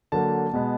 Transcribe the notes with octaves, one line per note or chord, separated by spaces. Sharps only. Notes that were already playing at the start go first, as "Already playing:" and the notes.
D3 F#3 A#3 A5
B2 G#3 B3